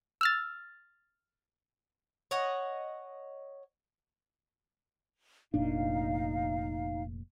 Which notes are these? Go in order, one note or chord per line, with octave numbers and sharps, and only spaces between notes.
E6 F6 A6
C#5 D#5 F#5
F1 A#2 D4 D#4 F5